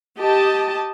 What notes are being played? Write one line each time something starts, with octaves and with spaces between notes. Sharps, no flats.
G4 D#5 A5